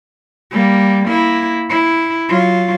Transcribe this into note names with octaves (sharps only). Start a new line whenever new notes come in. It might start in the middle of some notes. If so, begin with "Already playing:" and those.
G3 A#3
A#3 E4
E4
F#3 F4